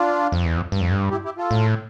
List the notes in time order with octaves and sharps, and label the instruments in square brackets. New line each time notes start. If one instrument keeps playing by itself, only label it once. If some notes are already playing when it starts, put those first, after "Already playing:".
Already playing: [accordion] D4 F4
[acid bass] F2
E2
F2
G2
F2
G2
[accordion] E4 G4
E4 G4
F4 A4
[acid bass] A2